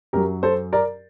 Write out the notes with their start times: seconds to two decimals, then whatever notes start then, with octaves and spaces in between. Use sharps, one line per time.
0.13 F#2 F#3 G4 A#4
0.43 A4 C5
0.73 A#4 D5